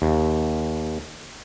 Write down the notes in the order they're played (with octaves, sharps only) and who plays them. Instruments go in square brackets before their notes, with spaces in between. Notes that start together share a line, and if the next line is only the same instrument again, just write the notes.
[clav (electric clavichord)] D#2